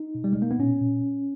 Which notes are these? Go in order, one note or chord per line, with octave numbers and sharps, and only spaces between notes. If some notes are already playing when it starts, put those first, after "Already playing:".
Already playing: D#4
B2
G3
G#3
B2
A#3
B3
A#2 C#4
A#2